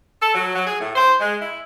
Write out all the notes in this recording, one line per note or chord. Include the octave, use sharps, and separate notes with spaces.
A4
F#3
F#3
G#4
A2
C5
G#3
E4